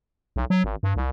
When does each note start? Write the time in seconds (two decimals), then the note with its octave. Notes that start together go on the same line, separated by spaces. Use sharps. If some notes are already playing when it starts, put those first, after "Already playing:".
0.36 B1
0.50 F#3
0.64 G#1
0.83 G2
0.96 C2